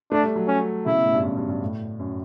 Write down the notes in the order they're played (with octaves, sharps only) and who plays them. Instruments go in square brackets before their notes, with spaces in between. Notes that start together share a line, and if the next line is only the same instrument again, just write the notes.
[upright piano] A3 [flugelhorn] D4
[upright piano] G3
F#3
[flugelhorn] C#4
[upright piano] C#3 [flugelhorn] E4
[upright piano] B2
A2
G2
F#2
G2
G2
A2
F#2